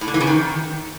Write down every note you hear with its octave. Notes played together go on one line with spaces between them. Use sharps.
A2
D3
E3
C#3
D#3